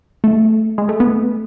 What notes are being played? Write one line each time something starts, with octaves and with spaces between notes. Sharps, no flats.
A3
G#3
A3
B3